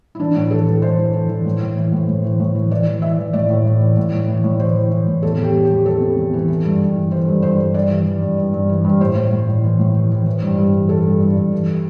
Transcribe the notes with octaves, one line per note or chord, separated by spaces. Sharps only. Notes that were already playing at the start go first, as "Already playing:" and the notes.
E4
E3 D4
A2
E3 A4
E3
E3 C5
E3
E3
E3
A2
A2
E3
A2
A2
E3
A2
E3
E3 D5
E3
E3 E5
E3
A2 D5
A2
A2
E3
A2
A2
E3
A2
E3 C5
E3
E3
A2
E2 A4
E2
G4
E2
G4
E2
E2 A4
C3
E2
E3
E3
G2
G2
E3
E3 C5
G2
G2 C5
G2
G2 D5
E3
E3
G2
G2
G2
E3
G2
A2 C5
A2
A2
A2
E3
A2
E3
E3
E3
G2
G2
E3
E3 A4
G2
G2
G2
E3